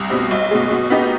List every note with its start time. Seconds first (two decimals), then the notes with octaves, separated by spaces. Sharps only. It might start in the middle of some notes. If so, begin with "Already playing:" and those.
Already playing: C2
0.10 B2 G3 C4
0.31 B1
0.51 B2 G#3
0.70 B2
0.90 B3 D#4 G4